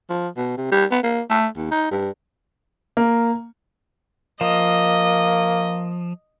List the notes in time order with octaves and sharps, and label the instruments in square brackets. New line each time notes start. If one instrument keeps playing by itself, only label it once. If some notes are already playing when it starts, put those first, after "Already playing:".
[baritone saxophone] F3
B2
C3
G3
B3
A#3
A3
D#2
D#4
G2
[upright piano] A#3
[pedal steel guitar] F3 [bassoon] A#3 [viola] D#5